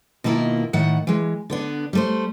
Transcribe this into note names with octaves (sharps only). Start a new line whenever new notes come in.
B2 D#3 A#3 E4 F4
A2 D#3 F#5
E3 G#3
D3 B3 D4
G3 A3 C5